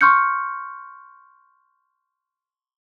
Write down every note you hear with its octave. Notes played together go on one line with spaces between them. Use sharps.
C6 C#6 F6 G6 C#7